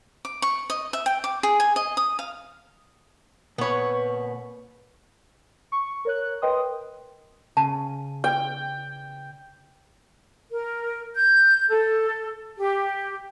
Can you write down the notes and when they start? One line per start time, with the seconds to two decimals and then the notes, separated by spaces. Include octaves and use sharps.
0.25 D6
0.42 C#6
0.70 D#5
0.93 E5
1.06 G5
1.24 D6
1.43 G#4
1.60 G#5
1.76 D#5
1.97 D#6
2.19 F5
3.58 A#2 B3 B4 C#5
5.72 C#6
6.05 A#4 C#5 F#6
6.42 A#4 B4 D#5 G5 C6 D#6
7.57 C#3 A5
8.24 G5
10.51 A#4
11.16 G6
11.70 A4
12.58 G4